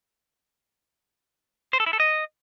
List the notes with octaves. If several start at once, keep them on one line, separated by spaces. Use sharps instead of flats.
C5
A4
E4
A4
D#5